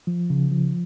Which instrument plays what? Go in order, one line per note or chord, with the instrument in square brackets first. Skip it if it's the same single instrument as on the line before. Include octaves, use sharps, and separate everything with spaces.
[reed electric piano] F3
C#3
F3